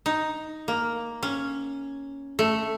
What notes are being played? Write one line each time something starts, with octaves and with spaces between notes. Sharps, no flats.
D#4
A#3
C#4
A3